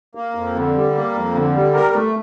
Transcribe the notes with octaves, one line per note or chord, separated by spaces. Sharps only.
A#3
F2
D3
G3
A#3
F2
D3
G3
A#4
A3